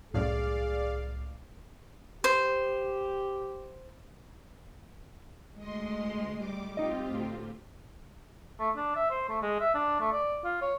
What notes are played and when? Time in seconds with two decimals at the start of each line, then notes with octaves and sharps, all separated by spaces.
0.14 C2 F#2 A2 G#4 D5 F5
2.24 G4 C5
5.58 D2 G#3 D#5 C6
6.37 G3 D6
6.77 C4 D#4 F4 G4 D#5
7.08 D2 A2
8.59 A3
8.76 D4
8.96 E5
9.10 C5
9.29 A3
9.42 G#3
9.60 E5
9.74 D4
10.00 A3
10.12 D5
10.44 F4
10.61 C#5